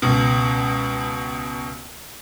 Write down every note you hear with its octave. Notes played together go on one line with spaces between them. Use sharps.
C#2 B2